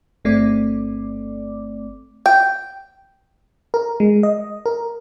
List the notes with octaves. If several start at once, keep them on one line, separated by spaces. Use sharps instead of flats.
G1 A3 C4 D5 D6
G5
A#4
G#3
D#5
A#4